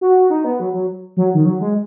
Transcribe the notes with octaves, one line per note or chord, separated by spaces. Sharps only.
F#4
D#4
B3
F#3
F#3
F#3
D#3
F#3
G#3